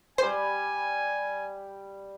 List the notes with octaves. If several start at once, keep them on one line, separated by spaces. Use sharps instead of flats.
G3 G4 C5 G#5